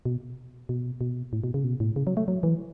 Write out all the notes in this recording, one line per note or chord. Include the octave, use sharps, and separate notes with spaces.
B2
B2
B2
A2
B2
C#3
B2
A2
C#3
F#3
A3
F#3
E3